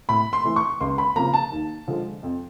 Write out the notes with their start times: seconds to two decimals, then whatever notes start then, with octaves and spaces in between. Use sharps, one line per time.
0.09 A2 B5
0.33 C6
0.44 E3 A3
0.56 C#6
0.81 C#2 C6
0.98 B5
1.16 C#3 F3 A#3 A#5
1.33 A5
1.52 D#2
1.87 D3 F3 G#3
2.23 F2